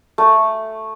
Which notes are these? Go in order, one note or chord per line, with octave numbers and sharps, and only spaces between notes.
A3